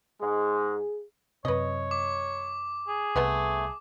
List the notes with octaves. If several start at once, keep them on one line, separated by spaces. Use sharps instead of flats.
G#2 G#3 G#4
F#2 C3 B4 C#5 D#5
D6
G#4
C2 A3 B3 B4